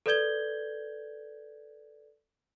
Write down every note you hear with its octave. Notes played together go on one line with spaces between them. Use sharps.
A4 B4 D5 G6 G#6 G7